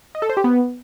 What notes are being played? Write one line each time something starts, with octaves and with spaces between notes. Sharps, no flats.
D#5
A4
C5
G4
B3